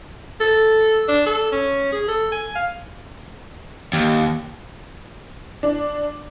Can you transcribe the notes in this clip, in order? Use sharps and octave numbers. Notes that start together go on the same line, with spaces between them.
A4
D4
A4
C#4
G#4
A4
G#5
F5
D#2
D4